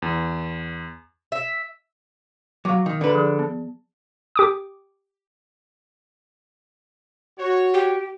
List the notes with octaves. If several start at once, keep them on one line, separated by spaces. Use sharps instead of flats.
E2
E5
F#3 F5 C#6 D6
D#3
D3 B4
F3 G#4
B3
G4 D6 D#6
F#4 C#5
G4